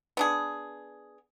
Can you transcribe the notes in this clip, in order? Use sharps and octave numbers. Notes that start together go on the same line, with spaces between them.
B3 D4 G#4